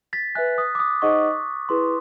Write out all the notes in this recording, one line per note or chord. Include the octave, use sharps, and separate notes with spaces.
A6 B6
B4 E5 G#5 F#6
D#6
D6
D#6
D#4 G#4 C5 D#5 F#5 C#6
E4 G#4 B4 C6